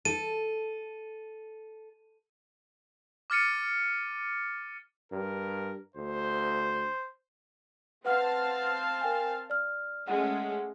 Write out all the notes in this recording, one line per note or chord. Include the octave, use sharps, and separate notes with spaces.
A4 D#7
D6 F6 A6 C#7 D#7
G2 A#4
D2 C5
C4 B4 F5 F#5 A5 F6
A#4 G5 G#5
D5 F6
G#3 A3 C#4 F#5